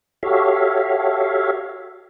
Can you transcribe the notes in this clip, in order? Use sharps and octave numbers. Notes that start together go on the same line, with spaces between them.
F#4 G4 A4 C#5 E5 F5